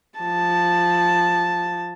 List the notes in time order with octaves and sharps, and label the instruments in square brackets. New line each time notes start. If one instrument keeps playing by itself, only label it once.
[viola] F3 A5